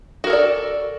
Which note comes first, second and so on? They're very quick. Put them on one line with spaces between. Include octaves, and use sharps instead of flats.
F#4 A#4 A4 D5